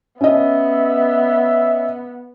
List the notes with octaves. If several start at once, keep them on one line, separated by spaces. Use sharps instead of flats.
B3 C#4 D#5 E5